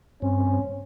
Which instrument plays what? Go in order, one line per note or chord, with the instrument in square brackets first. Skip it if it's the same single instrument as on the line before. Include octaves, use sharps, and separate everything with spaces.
[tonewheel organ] G2 C4 [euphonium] C#4